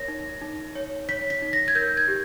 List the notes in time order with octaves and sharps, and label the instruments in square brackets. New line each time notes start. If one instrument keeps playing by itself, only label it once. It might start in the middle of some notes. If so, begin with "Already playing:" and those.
Already playing: [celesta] A#4 C#5 A#6
D#4
D#4
C#5
C#5 B6
B6
D#4
A#6
G#6
A#4 G6
G#6
G4